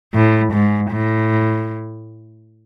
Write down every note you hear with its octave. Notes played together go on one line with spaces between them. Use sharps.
A2
G#2
A2